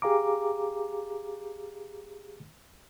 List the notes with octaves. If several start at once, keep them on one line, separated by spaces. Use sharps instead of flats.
G4 G#4 F5 A#5 D6